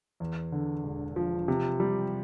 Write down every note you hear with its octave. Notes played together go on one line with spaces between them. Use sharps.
E2
D3
E1
F3
C3
G3